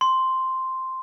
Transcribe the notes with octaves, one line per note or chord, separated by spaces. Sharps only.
C6